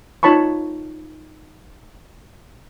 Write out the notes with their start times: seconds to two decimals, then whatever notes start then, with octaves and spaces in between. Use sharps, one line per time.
0.23 D#4 F4 C#5 A5 B5 C#6